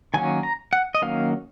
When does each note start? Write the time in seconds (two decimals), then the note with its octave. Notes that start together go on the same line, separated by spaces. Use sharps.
0.14 D#3 F#3 A#3 C#4 G#5
0.43 A#5
0.73 F#5
0.95 D#5
1.02 D#3 F#3 A#3 C#4 F5